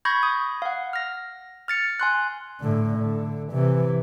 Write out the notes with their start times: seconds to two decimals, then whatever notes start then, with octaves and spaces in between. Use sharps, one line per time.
0.05 B5 C#6 G6 G#6 A#6
0.23 D#6
0.62 F5 F#5
0.93 F6 A#6
1.68 F6 A6 C#7
2.00 G#5 C6 F#6
2.61 A2 D3
2.99 D3
3.52 C3 E3